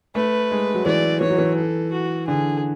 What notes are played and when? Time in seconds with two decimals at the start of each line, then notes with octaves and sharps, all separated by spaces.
0.15 A3 B4
0.51 G#3
0.75 F#3
0.86 E3 D5
1.21 E3 C#5
1.30 F#3
1.38 E3
1.57 A4
1.91 F#4
2.27 D3 G#4